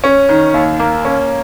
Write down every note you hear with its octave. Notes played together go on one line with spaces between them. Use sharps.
C#4
D#3
D#2
A#3
C#4